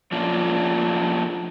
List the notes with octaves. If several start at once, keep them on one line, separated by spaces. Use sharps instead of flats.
F3 A3 A#3 C#4 D4 F4